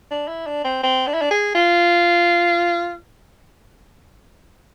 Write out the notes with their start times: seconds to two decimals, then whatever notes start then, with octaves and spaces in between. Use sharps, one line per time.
0.11 D4
0.28 E4
0.47 D4
0.64 C4
0.83 C4
1.07 D4
1.14 E4
1.21 D4
1.31 G#4
1.55 F4